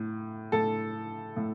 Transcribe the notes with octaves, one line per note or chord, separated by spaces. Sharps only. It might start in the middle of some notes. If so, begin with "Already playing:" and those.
Already playing: A2
A2 A4
A2